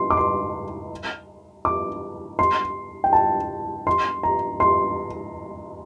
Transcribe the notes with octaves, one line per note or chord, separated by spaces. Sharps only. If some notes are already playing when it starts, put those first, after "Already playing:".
Already playing: C6
D6
C6
D6
C6
G5
A5
C6
A#5
C6